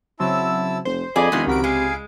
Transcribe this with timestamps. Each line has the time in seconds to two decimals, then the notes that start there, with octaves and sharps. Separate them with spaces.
0.20 C#3 F#3 C4 E4 A5 E6
0.85 F1 C5
1.16 F2 G#4 D5 D#5 G#5 B5
1.32 E1 F2 D#3 E4 F#4 C6
1.47 C#2 C3 F#4 A#4 B5 D7
1.64 G#3 G#4 F5